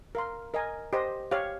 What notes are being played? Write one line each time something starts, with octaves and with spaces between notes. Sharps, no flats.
A#4 F5 C6
A#4 D#5 G#5
G4 C5 D#5
G4 C#5 F5